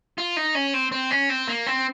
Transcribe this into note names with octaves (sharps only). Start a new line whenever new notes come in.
F4
D#4
C#4
C4
C4
C#4
C4
A#3
C4